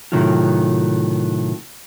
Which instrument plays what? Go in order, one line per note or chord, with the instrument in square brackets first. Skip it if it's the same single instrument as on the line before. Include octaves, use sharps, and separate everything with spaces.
[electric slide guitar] A2 C3 D#3 F#3 A3 F4